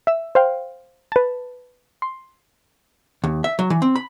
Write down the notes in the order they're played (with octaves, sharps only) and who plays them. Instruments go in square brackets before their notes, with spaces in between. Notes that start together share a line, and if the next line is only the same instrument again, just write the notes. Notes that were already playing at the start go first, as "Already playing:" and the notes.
[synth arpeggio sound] E5 E6
C5 F5 G5
B4 A5
C6
[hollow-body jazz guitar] D#2
E5
F#3
E3
C4
B5